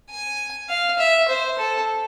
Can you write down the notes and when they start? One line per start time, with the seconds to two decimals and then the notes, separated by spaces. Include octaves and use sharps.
0.10 G#5
0.69 F5
0.99 E5
1.29 C5
1.59 A4